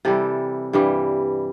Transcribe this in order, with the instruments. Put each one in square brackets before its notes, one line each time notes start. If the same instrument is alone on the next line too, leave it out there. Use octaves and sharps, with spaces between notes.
[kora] C3 E3 G3 A4
G2 E3 G3